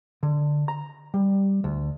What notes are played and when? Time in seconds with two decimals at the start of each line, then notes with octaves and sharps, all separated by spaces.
0.23 D3
0.68 A#5
1.14 G3
1.64 D2